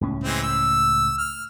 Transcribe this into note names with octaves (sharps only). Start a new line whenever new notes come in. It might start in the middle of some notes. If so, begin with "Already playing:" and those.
C#2 A2 C#4
E3 G#3 C4
E6
F6